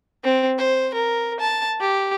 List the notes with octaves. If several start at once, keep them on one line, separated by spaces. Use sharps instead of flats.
C4
C5
A#4
A5
G4